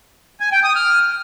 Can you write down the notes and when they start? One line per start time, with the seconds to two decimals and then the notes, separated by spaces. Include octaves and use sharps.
0.40 G#5
0.52 G5
0.64 D#6
0.76 F6